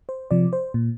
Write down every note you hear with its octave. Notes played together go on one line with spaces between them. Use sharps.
C5
C3 F3 D5
C5
A#2